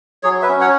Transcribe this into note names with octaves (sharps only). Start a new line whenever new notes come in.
F#3 G#4 C#5
B4 E5
C#4
C#5 F#5